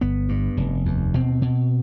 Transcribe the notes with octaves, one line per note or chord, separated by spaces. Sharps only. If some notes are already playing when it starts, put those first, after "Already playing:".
G1 B3
G2
F1
D#2
B2 C4
B2